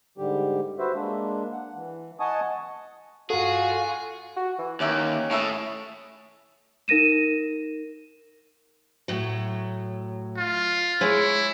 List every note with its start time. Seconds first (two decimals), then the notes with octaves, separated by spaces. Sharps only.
0.18 G#2 D3 G3 G4
0.79 F#4 B4 C5 E5
0.94 G#3 A#3 D4
1.53 F#5
1.75 E3
2.20 D#5 F#5 G#5 A5 C#6 D#6
3.30 G2 F4 F#4 G#4 A4
4.36 F#4
4.58 E3
4.80 D#2 C#4 A#4 E5 D6
5.31 A2 C#5 E5 D#6
6.88 D#4 A#4 A#6 D#7 E7
9.08 A2 F#3
10.38 F4
11.01 G#3 E4 C#5